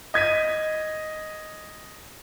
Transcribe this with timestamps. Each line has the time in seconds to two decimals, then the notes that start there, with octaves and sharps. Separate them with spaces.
0.14 D#5 G#6 B6 D#7